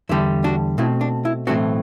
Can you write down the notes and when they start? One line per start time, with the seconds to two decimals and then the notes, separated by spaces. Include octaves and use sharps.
0.09 E2 D3 G3 E4
0.44 D4 F#4
0.78 B2 A3 C4 E4
1.01 D4
1.25 E4
1.47 B1 A2 E3 A3 C4 D4 F#4